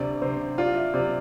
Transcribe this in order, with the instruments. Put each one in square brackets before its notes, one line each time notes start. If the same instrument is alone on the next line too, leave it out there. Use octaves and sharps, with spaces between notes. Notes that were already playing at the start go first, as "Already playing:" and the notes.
Already playing: [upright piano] D2 C3 [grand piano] D5
[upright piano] C3 [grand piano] C5
[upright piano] F4 [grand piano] D5
[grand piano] E5
[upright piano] C3 [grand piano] D5